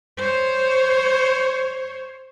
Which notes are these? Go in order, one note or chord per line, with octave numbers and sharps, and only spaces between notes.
C5 C#5